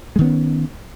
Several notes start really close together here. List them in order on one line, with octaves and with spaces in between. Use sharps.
G#3 D#3 B3 C#4